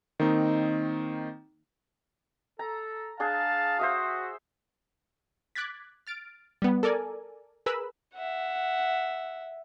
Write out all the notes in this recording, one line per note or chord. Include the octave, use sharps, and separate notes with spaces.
D#3 A#3 C4 D#4
A4 A#5
D4 G#4 F5 A5
F#4 C5 E5 D#6
D6 F#6 G#6 A6 B6
F6 A6 D7
G3 B3
A4 A#4 D5 G#5
G#4 A#4 B4 B5 E6
E5 F#5